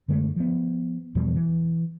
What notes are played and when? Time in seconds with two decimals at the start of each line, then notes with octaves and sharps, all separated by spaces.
0.08 F#2 D3 G#3 A3
0.36 F3 B3
1.15 E2 B2 F3 G3
1.35 E3